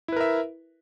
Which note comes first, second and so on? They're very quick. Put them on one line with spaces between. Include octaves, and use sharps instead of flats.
E4 B4 A#4 E5